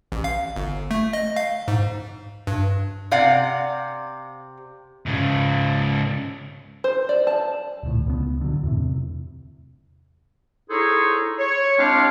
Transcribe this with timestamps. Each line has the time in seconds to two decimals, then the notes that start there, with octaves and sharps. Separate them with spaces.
0.12 A1
0.24 F5
0.56 G1
0.91 A3
1.13 D#5
1.36 F5
1.68 G#2
2.47 G2
3.11 C3 D5 F5 F#5
5.06 G#2 C#3
6.84 C5
7.09 D5
7.27 A5
7.83 D#1 D2 A2
8.07 C#2 B3
8.41 D3 F#3
8.63 E2 A2 C3
10.69 D#4 E4 G#4 A4 C5 C#5
11.39 C#5
11.77 G#3 C4 D4 E4 G4 F5